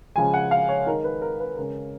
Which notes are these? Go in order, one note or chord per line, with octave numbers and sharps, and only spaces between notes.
C#3 F3 G#3 G#5
F#5
F5
C#5
D#3 G#3 D#4 A#4
B4
A#4
B4
C#3 G#3 C#4 A#4